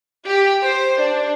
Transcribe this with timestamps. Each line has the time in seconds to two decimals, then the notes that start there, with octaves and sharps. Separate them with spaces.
0.25 G4
0.62 C5
1.00 D4